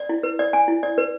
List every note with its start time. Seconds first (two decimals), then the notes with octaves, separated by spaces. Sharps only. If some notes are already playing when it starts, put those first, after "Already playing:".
Already playing: D5
0.09 E4
0.23 B4
0.39 D5
0.53 G#5
0.68 E4
0.83 D5
0.98 B4